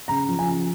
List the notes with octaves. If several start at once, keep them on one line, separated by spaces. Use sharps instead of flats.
C#3 A#5
F3
G#5
C#3